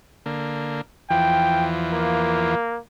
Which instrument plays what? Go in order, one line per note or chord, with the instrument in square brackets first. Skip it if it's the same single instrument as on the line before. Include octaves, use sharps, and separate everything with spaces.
[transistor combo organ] D3 A#3
[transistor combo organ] E2 E3 F3 [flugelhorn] G5
[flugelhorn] A#3